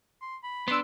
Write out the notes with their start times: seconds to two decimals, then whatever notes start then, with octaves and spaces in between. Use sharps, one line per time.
0.22 C6
0.43 B5
0.68 B3 D4 C6 E6